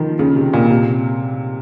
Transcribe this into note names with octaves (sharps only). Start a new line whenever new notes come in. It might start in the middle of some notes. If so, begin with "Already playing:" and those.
Already playing: D#3 F3
C#3
C3
A#2
C3